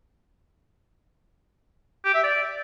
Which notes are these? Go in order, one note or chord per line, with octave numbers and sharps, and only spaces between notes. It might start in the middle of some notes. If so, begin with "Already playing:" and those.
G4
E5
D5